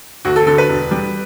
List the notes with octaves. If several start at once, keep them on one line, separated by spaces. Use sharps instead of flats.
D2 F#4
A4
D3 A4
B4
E1
G3